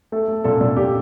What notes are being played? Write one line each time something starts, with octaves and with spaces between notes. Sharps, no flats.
A3 A4
A3
A#2 A4
A#2
A#2 G4